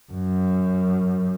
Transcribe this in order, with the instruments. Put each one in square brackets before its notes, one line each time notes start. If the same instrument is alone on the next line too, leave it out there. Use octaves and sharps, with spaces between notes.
[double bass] F#2